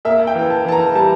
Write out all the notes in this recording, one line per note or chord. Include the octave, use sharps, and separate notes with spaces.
A#3 E5
G5
E3
A5
E3 A5
A#5
G3 A5